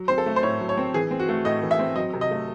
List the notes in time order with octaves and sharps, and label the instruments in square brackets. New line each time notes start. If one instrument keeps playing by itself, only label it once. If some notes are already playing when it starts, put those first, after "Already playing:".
Already playing: [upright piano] F#3
C4 C5
A4
A3
C5
A2 C#5
F#3
C#5
C4
E3 G#4
C4
F#4
A3
A2 D#5
E3
E5
C4
F#3 D#5
C3
D#5
A3